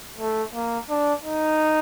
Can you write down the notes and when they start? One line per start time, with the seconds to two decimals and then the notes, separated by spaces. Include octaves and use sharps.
0.19 A3
0.54 A#3
0.89 D4
1.23 D#4